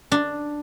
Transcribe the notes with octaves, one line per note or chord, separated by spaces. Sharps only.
D4